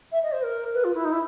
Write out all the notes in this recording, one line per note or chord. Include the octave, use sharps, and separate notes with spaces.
E5
D#5
C5
A#4
B4
F4
E4
D#4
E4